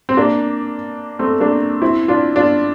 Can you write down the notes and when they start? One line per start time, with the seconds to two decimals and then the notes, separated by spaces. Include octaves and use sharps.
0.09 C4
0.17 A#3 D4
1.19 A3 C4
1.40 A#3 D4
1.81 C4 E4
2.08 D4 F4
2.36 D4 F4